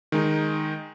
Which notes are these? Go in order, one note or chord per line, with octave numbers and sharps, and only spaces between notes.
D#3 G#3 D#4